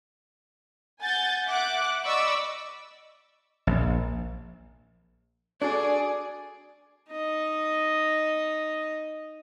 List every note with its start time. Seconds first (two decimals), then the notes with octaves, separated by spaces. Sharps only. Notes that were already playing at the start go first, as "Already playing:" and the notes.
1.02 F#5 G#5 G6 A6
1.46 E5 F#5 D6 F#6
2.04 D5 D#5 B5 C#6 D6 E6
3.67 A#1
5.62 D4 F#4 G#4 A4 D5
7.10 D#4 D#5